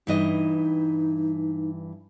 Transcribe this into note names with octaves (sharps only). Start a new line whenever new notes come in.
G2 E3 D#4 D#5